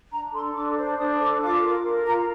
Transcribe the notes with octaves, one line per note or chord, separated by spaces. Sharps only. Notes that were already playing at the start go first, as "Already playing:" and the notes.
D4 A#5
A4 C6
D4 D6
C5
D4 D#6
A4 D6
F4 D6
A#4
A#4
F4 A#5